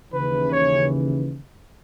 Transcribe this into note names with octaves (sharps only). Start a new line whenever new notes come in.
D#2 C#3 E3 B4
C#5